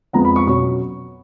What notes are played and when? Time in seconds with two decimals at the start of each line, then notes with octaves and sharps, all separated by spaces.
0.13 F2 F3 G#3 B3 A#5
0.25 B5
0.36 C#6
0.47 B2 F#3 C#4 C#6